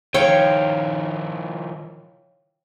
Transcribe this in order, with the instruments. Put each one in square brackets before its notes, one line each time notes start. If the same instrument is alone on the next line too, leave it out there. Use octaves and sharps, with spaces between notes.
[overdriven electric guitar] D#3 F3 [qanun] C#5 F5 G5